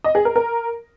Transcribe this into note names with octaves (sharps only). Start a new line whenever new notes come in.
D#5
G#4
A#4
A#4